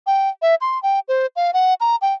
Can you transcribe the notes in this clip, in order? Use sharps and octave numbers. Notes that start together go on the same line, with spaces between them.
G5
E5
C6
G5
C5
F5
F#5
A#5
G5